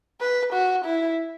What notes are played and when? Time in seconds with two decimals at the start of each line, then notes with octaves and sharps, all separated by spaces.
0.21 B4
0.53 F#4
0.85 E4